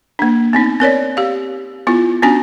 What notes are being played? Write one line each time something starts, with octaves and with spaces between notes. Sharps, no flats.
A#3 D4
B3 C4 D#4
C4 A#4 C#5 D5
G4 F5
B3 E4 F4
B3 C#4 D4 F#4 G#5